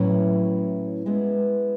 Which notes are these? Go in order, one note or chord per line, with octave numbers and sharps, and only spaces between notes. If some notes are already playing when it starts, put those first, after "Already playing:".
Already playing: A2 F#3 C#4 E4 B4
G#3 B3 E4 B4